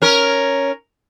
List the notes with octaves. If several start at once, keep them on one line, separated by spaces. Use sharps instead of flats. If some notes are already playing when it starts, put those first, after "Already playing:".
C#4 A#4